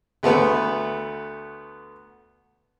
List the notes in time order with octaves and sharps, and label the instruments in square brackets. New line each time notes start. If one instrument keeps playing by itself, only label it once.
[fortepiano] D2 A3 B3 B4